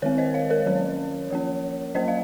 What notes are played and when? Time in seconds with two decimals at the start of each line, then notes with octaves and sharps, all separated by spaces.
0.02 D#3 G#3 C4 A#4 C#5
0.18 C5 D#5
0.34 C#5 F5
0.50 A#4 C#5
0.66 D#3 F#3 C#4
1.30 F3 A#3 C#4
1.95 F#3 A#3 C#4 C5 D#5
2.08 F5